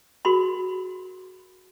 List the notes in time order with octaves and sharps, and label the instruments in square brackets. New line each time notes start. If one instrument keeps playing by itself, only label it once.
[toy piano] F#4 G#4 A#4 B5 C6